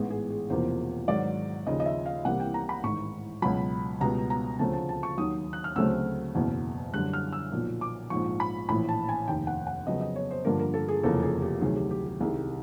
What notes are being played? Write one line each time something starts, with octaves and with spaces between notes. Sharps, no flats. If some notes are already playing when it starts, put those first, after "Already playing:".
Already playing: A1 G#2 E3 G#3 B3 G#4
G#4
G#4
E1 E2 C3 F3 A#3 C5
G#1 G#2 D#3 F#3 D5
D#2 C#3 F3 D#5
D#5
E5
F5
C2 C3 E3 G3 A#3 F#5
G5
A#5
B5
A1 G#2 D#3 C#6
C#2 B2 F#3 B5
C#2 B2 G3 B3 A#5
A#5
D2 C#3 F3 A3 C4 A5
A5
A5
C#6
D#2 D#3 F#3 D#6
F#6
F6
D2 C#3 F#3 A3 C4 E6
F#1 E2 B2
F#2 D3 G3 F#6
F6
E6
B1 A#2 F3
D6
A#1 G#2 F3 C#6
B5
A#1 A2 E3 B5
A5
G#5
F1 D#2 D#3 G5
F#5
F#5
F2 C#3 F#3 B3 D#5
D#5
C#5
C5
G2 D3 F3 A#3 A#4
A#4
A4
G#4
F1 E2 C#3 F3 A#3 A4
G#4
G4
D2 C3 D#3 F#3 G#4
G4
G4
G4
C2 C3 D#3 G3 G#4